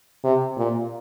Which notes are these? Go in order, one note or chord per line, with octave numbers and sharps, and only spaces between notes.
C3
A#2